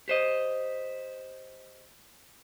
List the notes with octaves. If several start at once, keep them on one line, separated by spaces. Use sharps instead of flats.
G4 C5 D#5